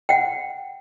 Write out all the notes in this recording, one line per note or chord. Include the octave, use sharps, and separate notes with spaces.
F#5 G5